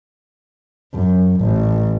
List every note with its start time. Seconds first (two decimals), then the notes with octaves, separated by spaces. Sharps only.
0.94 F#2
1.41 A1